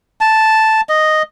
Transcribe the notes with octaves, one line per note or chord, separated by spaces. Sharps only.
A5
D#5